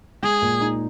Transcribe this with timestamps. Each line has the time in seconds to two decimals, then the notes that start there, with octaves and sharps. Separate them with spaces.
0.23 G#3 G#4
0.42 A#2
0.61 D#4